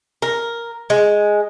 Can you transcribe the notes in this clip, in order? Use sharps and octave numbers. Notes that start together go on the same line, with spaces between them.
A#4
G#3